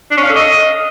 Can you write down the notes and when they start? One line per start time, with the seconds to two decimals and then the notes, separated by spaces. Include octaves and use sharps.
0.11 D4
0.17 C#4
0.23 F5
0.29 A4
0.36 D#5